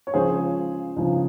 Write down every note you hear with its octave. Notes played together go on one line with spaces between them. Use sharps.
C#5
C#2 C#3 F3 G#4 C5
C#2 C#3 F3